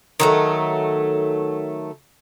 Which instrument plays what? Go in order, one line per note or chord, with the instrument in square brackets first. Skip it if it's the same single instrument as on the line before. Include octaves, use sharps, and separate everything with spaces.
[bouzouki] D#3 F#3 A3